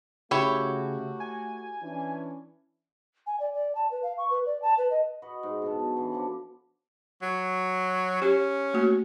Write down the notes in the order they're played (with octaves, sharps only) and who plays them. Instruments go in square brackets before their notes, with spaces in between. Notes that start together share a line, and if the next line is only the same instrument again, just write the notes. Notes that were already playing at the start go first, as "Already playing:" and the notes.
[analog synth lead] C#3 [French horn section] A3 F#4 [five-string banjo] E4 G4 C#5
[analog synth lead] G#5
[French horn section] E3 C#4 D4
[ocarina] G#5
D5
D5
A5
B4
F5
C#6
B4
D5
A5
B4
D#5
[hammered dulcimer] F#4 B4 D#5
G#2
B2 D3 B3 A4
F#3
D3 E3
F3 D4 D5
[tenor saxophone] F#3
[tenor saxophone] C#4 [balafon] G4
[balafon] A3 A#3 F#4